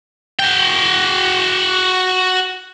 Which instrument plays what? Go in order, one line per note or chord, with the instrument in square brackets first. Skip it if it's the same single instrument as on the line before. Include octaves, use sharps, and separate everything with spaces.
[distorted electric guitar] F#4 G5